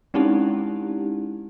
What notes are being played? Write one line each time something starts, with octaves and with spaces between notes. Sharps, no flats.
G#3 C4 C#4 D#4 E4 G4